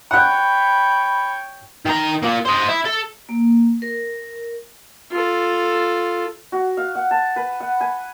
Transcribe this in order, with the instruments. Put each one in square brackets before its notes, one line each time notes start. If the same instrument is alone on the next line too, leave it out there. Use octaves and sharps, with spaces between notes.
[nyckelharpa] C#5 G5 [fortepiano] F#5 F#6 [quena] B5
[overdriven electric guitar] D#3 A#5
A#3 F4
C5 D#5
E4
A4
[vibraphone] A#3
A#4
[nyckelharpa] F4 A4
[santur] F#4
F5
F#5
A5
B4
F#5
G#5